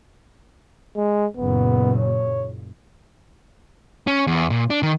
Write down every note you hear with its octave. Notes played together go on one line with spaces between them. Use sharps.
G#3
F#1 A#2 B3
C#5
C#4
E2
A#2
D4
D#3